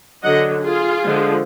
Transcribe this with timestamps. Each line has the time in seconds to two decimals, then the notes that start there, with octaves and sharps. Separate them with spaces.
0.23 D3 F#3 D4 D#5 F#5
0.63 F4 G#4
1.04 D3 F3 G#3